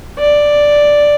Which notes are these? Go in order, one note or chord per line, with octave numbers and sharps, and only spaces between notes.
D5